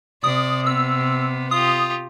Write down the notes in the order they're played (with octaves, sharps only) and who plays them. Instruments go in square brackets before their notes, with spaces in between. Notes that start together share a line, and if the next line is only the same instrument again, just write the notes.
[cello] C3 [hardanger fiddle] D5 [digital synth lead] D#6
[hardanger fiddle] B3 [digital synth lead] E6
[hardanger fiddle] F4 G4 [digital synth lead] D#6